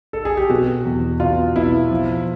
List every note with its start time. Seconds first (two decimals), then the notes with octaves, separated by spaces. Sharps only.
0.13 A4
0.25 G#4
0.37 G4
0.49 B2 F#4
0.85 E2
1.20 B2 F4
1.56 B2 E4
1.90 F3